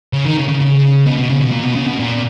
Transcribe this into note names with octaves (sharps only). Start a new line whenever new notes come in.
C#3
D#3
C#3
C#3
C#3
B2
B2
C#3
B2
A#2
B2
C#3
B2
A#2